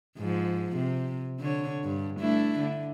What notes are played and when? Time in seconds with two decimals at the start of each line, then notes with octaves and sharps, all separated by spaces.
0.18 G#2 F3
0.76 C3
1.40 D3 C#5
1.84 G2
2.20 A3 D4 E4
2.60 D3